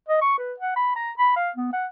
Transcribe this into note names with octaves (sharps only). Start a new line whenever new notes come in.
D#5
C#6
B4
F#5
B5
A#5
B5
F5
B3
F#5